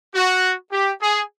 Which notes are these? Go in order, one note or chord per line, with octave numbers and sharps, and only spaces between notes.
F#4
G4
G#4